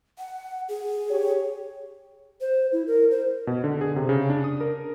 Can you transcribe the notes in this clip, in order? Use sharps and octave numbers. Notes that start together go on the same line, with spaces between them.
F#5
G#4
G4 C#5
C5
E4
A#4
C5
B2
D3
G#4
C3
C#3
D4
D#6
A#4